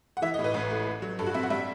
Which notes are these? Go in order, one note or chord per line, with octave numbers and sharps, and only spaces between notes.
F#5
E3 E5
D#5
A2
B4
A1
A3
A3
F#3
G2 A4
F#4
C4 E5
F#5
G3 E5